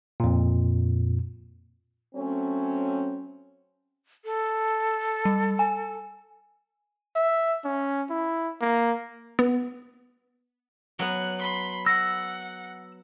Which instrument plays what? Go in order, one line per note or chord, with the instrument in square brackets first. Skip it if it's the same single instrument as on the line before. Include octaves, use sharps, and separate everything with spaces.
[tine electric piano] F2 A#2
[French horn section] F#3 A3 C4 C#4
[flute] A4
[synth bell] G3
G#5
[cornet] E5
C#4
E4
A#3
[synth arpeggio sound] B3
[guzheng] F#3 B3 [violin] F#6
[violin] B5 C6
[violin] F#5 [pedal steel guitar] E6 [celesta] A#6